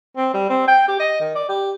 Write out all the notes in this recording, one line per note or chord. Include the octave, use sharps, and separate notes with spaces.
C4
G3
C4
G5
G4
D#5
D#3
D5
G4